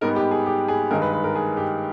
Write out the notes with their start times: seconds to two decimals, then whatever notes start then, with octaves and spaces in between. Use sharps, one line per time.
0.01 G#2 G3 B3 D#4 A#4
0.16 G4
0.31 G#4
0.46 G4
0.68 G#4
0.91 G2 D#3 G#3 D#4 A#4
1.02 B4
1.13 B4
1.24 A#4
1.36 G#4
1.57 G4